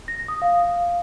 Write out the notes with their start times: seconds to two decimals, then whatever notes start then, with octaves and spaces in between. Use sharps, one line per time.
0.08 A#6
0.28 D#6
0.42 F5